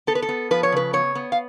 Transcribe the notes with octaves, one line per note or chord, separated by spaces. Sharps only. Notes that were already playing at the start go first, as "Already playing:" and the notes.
B3 A4
B4
A4
B3
F3 B4
C#5
C#3 B4
B3 C#5
B3
F5